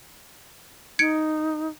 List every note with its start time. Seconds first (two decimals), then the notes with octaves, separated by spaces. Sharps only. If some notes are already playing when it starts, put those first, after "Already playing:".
0.99 D#4 G#6 C#7 D7